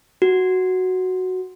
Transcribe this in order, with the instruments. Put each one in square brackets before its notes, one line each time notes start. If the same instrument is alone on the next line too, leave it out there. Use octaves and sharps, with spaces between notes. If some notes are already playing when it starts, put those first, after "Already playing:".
[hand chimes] F#4